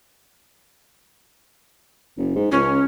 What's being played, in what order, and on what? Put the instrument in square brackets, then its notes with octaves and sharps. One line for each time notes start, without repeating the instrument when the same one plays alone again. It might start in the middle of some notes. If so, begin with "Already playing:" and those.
[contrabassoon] F#1
G#2
[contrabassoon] C#2 [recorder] C#4